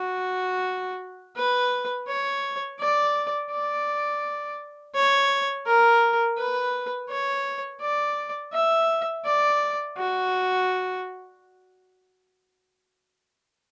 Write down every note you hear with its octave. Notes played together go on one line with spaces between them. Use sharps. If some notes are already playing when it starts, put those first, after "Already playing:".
Already playing: F#4
B4
C#5
D5
D5
C#5
A#4
B4
C#5
D5
E5
D5
F#4